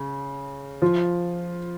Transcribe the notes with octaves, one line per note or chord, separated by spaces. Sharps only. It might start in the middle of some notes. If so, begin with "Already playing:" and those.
Already playing: C#3
F3 F4